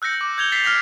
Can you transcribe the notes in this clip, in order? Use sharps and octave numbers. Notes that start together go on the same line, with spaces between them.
E6 F#6 G6 A#6 C#7
D6
G6 G#6 F7 G7
G6 A6 B6 C7 F7
F6 F#6 A#6 B6 F7